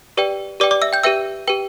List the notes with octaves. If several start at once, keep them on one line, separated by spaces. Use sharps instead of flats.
G4 B4 D5 G5
G4 B4 D5 G5 D6
D5 D6
E5 E6
G5 G6
G4 B4 E5 G5 E6
G4 B4 G5